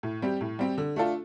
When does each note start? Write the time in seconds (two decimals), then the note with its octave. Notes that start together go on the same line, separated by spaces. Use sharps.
0.03 A2
0.22 G3 C4 G4
0.41 A2
0.59 G3 C4 G4
0.78 D3
0.96 A3 D4 F4 A4